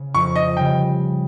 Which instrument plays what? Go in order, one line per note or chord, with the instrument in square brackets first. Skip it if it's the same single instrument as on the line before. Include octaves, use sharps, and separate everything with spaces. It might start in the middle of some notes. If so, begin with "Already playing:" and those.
Already playing: [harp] C#3
[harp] F2 [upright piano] C#6
[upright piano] D#5
[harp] C#3 G3 [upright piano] G5